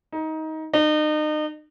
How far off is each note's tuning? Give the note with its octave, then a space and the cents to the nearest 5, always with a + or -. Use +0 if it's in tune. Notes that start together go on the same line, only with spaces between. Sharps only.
D#4 +20
D#4 -35